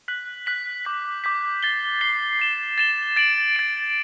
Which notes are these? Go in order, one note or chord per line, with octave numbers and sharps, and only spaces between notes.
F#6 B6 F#7
F#6 B6 F#7
D6 G6 B6
D6 G6 B6
A6 C7 G7
A6 C7 G7
A6 E7 G7
A6 E7 G7
A6 D7 F#7
A6 D7 F#7